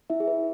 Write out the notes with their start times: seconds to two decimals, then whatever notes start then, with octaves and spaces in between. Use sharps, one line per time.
0.10 E4 E5
0.20 G#4
0.27 B4